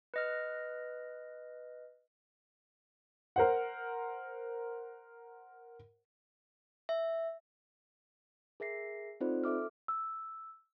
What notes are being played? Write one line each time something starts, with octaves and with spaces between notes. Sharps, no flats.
B4 D#5 F6
A#4 C5 F#5
E5
G#4 A#4 E5 A#6 C7
C4 D#4 F4 A4 C5 D5
A4 E5 D6 F6
E6